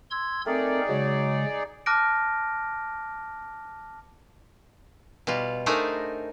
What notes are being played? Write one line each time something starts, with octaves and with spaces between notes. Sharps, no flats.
C6 E6 G#6
A3 C4 D#4 G#4 A#4 D5
C#3 F#3 G#3
A5 D6 F6 F#6 A#6 D7
B2 G3 F4
A3 D4 D#4 G#4 A#4 C5